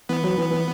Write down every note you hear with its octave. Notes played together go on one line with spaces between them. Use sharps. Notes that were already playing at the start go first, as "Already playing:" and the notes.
E3 B3
F#3
E3
E3